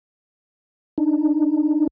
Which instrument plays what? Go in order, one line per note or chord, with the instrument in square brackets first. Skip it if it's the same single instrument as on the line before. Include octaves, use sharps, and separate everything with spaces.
[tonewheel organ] D4 D#4